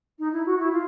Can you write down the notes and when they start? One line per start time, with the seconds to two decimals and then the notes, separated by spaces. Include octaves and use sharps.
0.19 D#4
0.33 E4
0.46 F#4
0.59 E4
0.72 F4